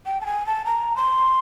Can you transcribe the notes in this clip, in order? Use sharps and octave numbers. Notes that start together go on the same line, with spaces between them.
G5
A5
G#5
A5
A#5
C6